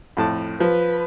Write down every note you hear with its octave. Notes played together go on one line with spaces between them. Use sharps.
F2 A2 A5
F3 B4